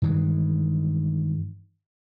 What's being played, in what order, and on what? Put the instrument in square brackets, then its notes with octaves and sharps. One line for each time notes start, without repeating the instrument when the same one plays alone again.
[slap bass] G2 D#3 E3 G#3